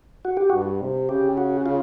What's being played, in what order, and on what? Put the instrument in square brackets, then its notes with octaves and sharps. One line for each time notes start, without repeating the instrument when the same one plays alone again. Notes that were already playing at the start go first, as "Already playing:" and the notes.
[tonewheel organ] F#4
G4
[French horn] G2 [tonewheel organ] F#4
[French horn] C3
[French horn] C#3 [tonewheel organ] G4
[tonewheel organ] F#4
F4